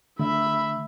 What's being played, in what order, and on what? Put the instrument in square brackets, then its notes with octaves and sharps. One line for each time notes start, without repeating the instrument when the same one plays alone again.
[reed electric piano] D3 [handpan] A3 [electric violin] E5 B5